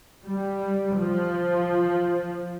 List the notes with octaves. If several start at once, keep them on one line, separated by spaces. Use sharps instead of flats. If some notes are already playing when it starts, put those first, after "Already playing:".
G3
F3